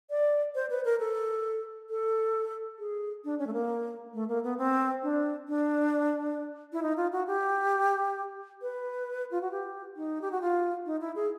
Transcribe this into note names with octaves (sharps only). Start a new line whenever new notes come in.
D5
C5
B4
A#4
A4
A4
G#4
D4
C#4
A3
A#3
A3
A#3
B3
C4
D4
D4
E4
D#4
F4
F#4
G4
B4
F4
F#4
G4
D#4
G4
F#4
F4
D#4
E4
G#4